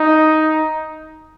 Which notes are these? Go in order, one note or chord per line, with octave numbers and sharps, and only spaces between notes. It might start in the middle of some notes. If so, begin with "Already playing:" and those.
Already playing: D#4